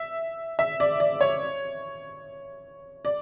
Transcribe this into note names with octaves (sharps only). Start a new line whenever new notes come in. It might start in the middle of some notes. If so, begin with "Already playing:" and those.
Already playing: E5
E5
D5
D5
C#5
D5